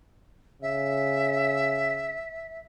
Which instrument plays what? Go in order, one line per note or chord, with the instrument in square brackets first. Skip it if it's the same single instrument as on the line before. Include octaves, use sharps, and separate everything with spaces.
[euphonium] C#3 [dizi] E5